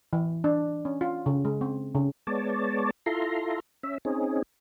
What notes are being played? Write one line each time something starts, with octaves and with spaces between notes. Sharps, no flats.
E3
D4
C#4
F4
C#3
G#3
C4
C#3
G#3 B3 C#5 D5 A5
E4 F4 A4 A#5 C6
C#4 E5
C4 C#4 D#4 G#4